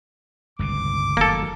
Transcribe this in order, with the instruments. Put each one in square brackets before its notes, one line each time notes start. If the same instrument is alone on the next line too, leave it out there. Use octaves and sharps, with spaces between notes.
[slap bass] G1 C#2 B2 [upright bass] G2 [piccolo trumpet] D6
[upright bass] F#1 A2 [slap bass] D#3 F#3 [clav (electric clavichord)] A#3 A4